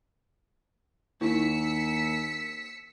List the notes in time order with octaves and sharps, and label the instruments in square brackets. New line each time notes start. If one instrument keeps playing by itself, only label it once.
[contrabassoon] D#2 [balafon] D#4 E4 [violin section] E6 B6 C#7